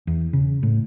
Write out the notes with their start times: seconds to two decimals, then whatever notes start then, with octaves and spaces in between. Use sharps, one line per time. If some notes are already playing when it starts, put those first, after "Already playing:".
0.07 E2
0.33 C#3
0.63 A2